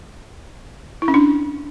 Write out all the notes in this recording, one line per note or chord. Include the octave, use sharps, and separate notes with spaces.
E4
C#4
D4